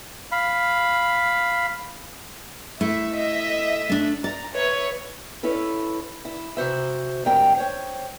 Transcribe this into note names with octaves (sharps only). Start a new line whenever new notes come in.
F5 B5
A3 E4 E5
D#5 E5
A3 D4
D5 A#5
B4 C#5 E5
C#4 E4 A4 B4
E4
C3 F#4 C5 E5
D2 G#2 C4 G4 A#4 G5
C5 C#5 G5